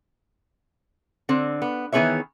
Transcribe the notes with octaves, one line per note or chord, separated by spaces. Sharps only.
D3 C4
B3
D#3 E3 B3 G#4 C#5 E5